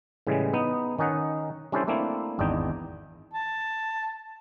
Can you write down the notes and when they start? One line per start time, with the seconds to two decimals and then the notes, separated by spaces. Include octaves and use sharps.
0.27 A2 C#3 E3 G3 G#3
0.54 B3 D#4
0.99 D#3 C#4 D#4 F#5
1.72 G3 C#4 D4 E4 A4 C5
1.88 A3 A#3 C4 D4 E4
2.39 G#1 E2 D4 D#4 G5
3.33 A5